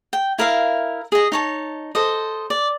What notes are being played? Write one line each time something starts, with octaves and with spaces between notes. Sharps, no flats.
G5
E4 A#4 E5 F5
G#4 D#5
D#4 C#5 A5
A4 C5 D#5
D5